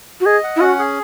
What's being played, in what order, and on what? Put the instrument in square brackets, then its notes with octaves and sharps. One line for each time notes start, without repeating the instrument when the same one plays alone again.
[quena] F#4
[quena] G#4 [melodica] D#5
[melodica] F#5
[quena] E4
[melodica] C#4 [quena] F#4
[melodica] G#4